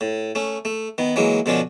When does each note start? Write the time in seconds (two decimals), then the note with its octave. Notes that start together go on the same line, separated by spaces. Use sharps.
0.01 A2
0.35 A3 C#4
0.65 A3
0.98 D#3 B3
1.16 E3 F#3 G#3 A#3
1.46 B2 D3 F3 C#4 D4